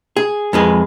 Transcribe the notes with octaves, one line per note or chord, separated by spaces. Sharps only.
G#4
F2 G#3 G#4 B4